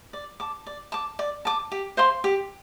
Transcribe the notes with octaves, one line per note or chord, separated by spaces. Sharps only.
D5
A5 D6
D5
A5 D6
D5
A5 D6
G4
C5 F5 C6
G4